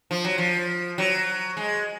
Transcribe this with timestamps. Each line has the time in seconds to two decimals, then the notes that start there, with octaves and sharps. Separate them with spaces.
0.11 F3
0.24 F#3
0.38 F3
0.98 F#3
1.57 G#3